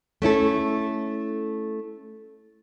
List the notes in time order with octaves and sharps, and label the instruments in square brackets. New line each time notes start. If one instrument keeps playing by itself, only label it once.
[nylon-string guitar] A3 C#4 E4 A4